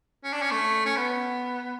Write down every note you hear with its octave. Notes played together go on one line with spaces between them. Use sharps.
C#4
D4
C#4
A3
C#4
B3